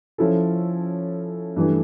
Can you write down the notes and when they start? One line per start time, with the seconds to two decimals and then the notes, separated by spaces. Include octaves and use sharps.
0.18 F3 C#4 E4 A4
1.56 G2 E3 A3